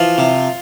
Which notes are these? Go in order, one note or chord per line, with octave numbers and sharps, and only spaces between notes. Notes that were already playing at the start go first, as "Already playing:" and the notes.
Already playing: E3 F3 F4
C3